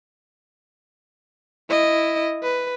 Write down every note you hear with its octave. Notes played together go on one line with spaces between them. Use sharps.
E4 D#5
B4